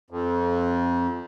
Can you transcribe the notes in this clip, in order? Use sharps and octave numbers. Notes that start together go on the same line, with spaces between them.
F2